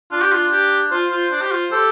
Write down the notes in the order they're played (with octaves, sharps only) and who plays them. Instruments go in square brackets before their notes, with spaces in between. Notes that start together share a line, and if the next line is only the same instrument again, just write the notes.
[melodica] D4 [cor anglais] F4
[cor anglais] G4
F4
G4
[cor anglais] F4 [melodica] C5
[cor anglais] F4
D4
G4
F4
[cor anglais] G4 [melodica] A4